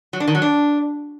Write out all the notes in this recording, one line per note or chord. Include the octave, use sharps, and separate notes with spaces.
F#3
D4
D#3
F#3
D4